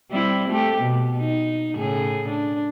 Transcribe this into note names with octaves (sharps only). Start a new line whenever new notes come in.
G3 C4 E4
A3 G4
B2
D#4
A2 C#3 G#4
D4